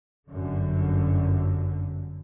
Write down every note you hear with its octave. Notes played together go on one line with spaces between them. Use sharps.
G1 F#2 D3